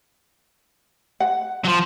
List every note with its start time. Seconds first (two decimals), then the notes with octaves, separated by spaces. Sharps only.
1.20 F#5
1.65 F3 F#3